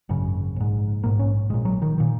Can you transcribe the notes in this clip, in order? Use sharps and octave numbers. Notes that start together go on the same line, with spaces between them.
G#1 F#2 C#3
A#1 G#2
A#1 G#2 A#3
C#4
A#1 A#2 G#3
F#3
D#3
A#2 D#3